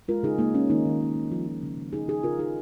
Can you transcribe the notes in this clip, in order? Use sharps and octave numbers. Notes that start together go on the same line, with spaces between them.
G#3 F4 A#4
C#3 D#4 G#4
G#3 A#3 D#4
G#3 C#4
D#3 A#3 D#4
D#3
A#3
A#3
F3
F3
C#3
C#3
C#3 D#4 G#4
C#3 D#4 G#4
C#3 F4 A#4
C#3 D#4 G#4